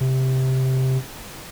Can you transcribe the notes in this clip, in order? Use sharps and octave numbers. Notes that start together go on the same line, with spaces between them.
C3